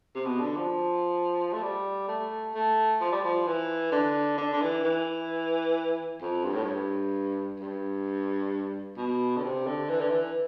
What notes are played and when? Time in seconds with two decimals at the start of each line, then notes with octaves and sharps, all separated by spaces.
0.15 C3
0.25 B2
0.40 D3
0.56 F3
1.53 A3
1.62 G3
2.08 A3
2.54 A3
3.01 F3
3.12 G3
3.24 F3
3.47 E3
3.92 D3
4.38 D3
4.53 D3
4.62 E3
4.84 E3
6.21 F2
6.45 G2
6.54 A2
6.64 G2
7.59 G2
8.97 B2
9.37 D3
9.43 C3
9.67 D3
9.90 E3
10.01 D3
10.11 E3